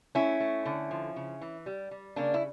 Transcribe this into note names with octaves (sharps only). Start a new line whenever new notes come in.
A3 C#4 E4
A3
D3
F3
C#3
E3
G3
G3
C#3 A#3 D4
E4